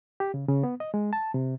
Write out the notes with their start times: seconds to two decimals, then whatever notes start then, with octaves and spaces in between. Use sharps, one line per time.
0.20 G4
0.34 C#3
0.48 C#3
0.63 B3
0.80 D#5
0.94 G#3
1.13 A5
1.34 C3